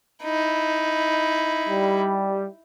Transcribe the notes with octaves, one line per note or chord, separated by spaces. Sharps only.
D#4 E4
G3